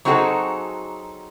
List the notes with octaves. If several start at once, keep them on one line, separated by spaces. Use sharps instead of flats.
F#3 C4 D#4 F#4 G#4 A4